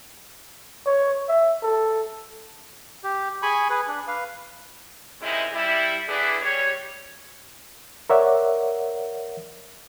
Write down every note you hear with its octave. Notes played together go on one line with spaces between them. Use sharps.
C#5
E5
A4
G4
G#4 G#5 B5 C#6
G#4 B4
D4
B4 F5
F#2 C3 G#3 D#4 E4
G3 E4
D3 E4 G#4 B4 D5
G3 C#5
A#4 C#5 D5 E5 F#5